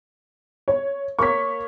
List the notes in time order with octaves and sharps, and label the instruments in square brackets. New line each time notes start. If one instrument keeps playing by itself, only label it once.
[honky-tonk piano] C#5
[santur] A#3 C#5 [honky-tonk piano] C#6 B6